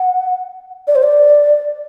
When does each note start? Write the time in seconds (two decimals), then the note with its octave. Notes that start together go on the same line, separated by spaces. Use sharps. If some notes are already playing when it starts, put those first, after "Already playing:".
Already playing: F#5
0.87 D5
0.95 C5
1.03 D5